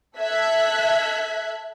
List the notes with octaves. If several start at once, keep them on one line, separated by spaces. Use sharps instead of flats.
A4 E5 F#6 G#6 B6